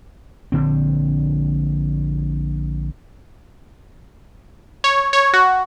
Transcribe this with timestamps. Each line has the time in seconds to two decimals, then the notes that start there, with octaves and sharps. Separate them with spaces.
0.52 A#1 D3 C4
4.84 C#5
5.13 C#5
5.34 F#4